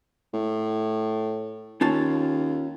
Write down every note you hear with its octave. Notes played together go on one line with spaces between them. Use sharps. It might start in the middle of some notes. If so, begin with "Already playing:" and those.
A2
D#2 C#4 F4 A5